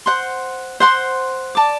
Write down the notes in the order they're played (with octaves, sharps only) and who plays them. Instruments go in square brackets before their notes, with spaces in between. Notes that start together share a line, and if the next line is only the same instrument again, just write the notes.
[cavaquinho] C5 F#5 C6
C5 F#5 C6
D5 A5 D6